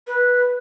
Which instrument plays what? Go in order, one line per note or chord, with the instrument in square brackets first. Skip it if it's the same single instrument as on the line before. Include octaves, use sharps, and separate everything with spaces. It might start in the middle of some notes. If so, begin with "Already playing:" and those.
[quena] B4